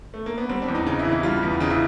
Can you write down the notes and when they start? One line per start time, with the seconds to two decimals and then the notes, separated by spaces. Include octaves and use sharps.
0.14 A3
0.26 A#3
0.38 B3
0.49 G3 C4
0.62 D4
0.68 E2
0.75 D#4
0.86 C#3 D#4
0.99 E4
1.05 E3
1.12 E4
1.23 G3 F4
1.43 E2
1.60 C#3 D#4
1.70 E4